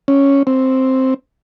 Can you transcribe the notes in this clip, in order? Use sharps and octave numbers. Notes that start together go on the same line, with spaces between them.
C#4
C4